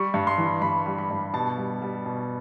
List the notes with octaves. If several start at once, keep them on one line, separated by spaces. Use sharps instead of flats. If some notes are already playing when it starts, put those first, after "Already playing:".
Already playing: G3 C#6
G2
C6
E3
G2 B5
G3
B5
G2
B2 A5
G3
G3
B2